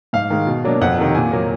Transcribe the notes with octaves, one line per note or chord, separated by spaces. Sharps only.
G#2 F5
D#3 G#3
B2
F#3 A#3 D4
F2 F#5
C3 D#3
A#2 G#5
F#3 A#3